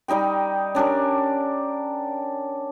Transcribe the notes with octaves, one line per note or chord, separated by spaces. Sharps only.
G3 D#4 D#5 G5
C#4 D4 G4 A#4